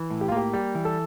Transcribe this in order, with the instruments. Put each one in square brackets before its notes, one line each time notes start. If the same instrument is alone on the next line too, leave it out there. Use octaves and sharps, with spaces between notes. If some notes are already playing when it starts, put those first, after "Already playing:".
Already playing: [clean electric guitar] E3
A2
[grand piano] G4
F4
[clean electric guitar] A#3 [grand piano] G4
[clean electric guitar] G3 [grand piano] G4
[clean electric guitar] E3
[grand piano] A4